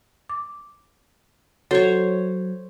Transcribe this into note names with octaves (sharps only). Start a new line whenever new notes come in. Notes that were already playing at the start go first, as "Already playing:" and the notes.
D6
F#3 A4 C5 C#5